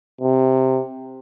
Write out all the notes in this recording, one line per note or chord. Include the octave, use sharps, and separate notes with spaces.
C3